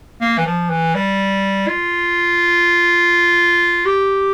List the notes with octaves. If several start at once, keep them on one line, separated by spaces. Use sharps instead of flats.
A#3
E3
F3
E3
G3
F4
G4